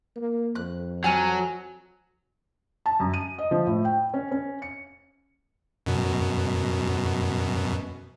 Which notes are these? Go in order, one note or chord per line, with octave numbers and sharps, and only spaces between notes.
A#3
F2 F#6
F#3 G#5 A5 F6
A5
F#2
D#7
D#5
F3
A2
G5
C#4
C#4
C#7
F#2 B2